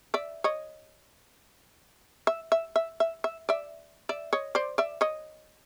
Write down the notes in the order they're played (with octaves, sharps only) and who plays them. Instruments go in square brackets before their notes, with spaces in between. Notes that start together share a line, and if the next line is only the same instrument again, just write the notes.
[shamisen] D5 E5
C#5 D#5
E5
E5
E5
E5
E5
D5 E5
D5 E5
C#5 D#5
C5 D5
D5 E5
C#5 D#5